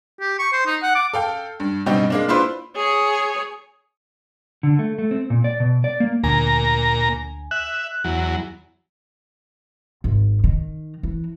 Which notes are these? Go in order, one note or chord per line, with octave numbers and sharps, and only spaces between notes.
G4
C#6
C5
D#4
F#5
D6
A4 F5 G5
G2
G2 B2 G3 C4 D#4 G4
G#3 A#3 D4
D4 E4 F4 B4 C5 C6
G#4 C#5
D3
A3
A3
C4
A#2
D5
B2
D5
A#3
D2 A#2 G#5 A#5
E5 F#6
E2 F#3
G#1
D#3
E3